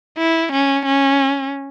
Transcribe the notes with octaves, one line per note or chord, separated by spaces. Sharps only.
E4
C#4
C#4